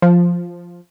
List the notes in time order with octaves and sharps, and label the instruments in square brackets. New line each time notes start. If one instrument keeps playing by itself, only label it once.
[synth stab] F3